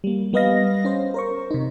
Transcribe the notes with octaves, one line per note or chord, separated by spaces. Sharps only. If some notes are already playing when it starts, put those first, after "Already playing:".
G3 A#3
G3 B3 B4 D#5 F5 A#6
C#4 C5
A#4 C5 C#6
C3 D#4